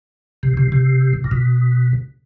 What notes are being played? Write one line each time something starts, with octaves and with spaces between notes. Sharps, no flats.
C3
C3
C3
A#2
B2